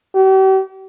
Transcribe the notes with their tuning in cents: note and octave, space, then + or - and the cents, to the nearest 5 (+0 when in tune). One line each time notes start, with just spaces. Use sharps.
G4 -45